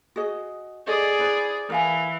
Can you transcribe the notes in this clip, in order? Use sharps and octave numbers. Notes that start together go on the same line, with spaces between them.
F#4 G#4 D#5
G#4 A4 D5 D#5
E4 B4 C5
E3 A#4 F5 G#5